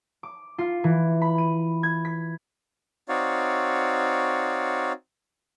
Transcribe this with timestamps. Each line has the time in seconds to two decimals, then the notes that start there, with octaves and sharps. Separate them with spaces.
0.23 D6
0.58 F4
0.84 E3
1.22 B5
1.38 D#7
1.83 G#6
2.05 B6
3.09 C4 D#4 F#4 C#5 D5 F5